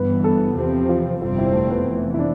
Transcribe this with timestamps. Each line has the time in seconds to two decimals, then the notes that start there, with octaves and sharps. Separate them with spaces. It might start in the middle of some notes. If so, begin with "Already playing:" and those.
Already playing: G1 G2 E3 B3 B4
0.24 A4
0.56 E2 C3 F3 C4 G4
0.81 G4
0.89 F4
1.21 G1 F2 C3 G3 C4 F4
1.38 E4
1.53 A3
1.71 B3
1.86 F1 F2 E3
2.14 E4
2.19 D4